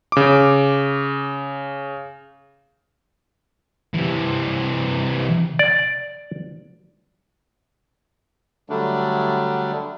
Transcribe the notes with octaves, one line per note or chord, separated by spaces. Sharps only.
C#3 D6
C3 E3
D5
D3 F#3 G3 A3 D4